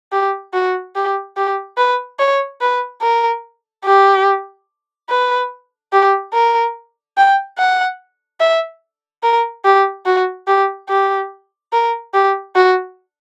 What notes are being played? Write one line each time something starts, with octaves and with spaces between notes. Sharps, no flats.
G4
F#4
G4
G4
B4
C#5
B4
A#4
G4
B4
G4
A#4
G5
F#5
E5
A#4
G4
F#4
G4
G4
A#4
G4
F#4